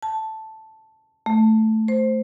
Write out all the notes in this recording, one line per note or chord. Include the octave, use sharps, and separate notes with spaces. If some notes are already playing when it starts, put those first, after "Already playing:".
A5
A3
C5